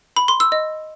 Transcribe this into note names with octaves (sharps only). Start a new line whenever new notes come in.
B5
C6
E6
D#5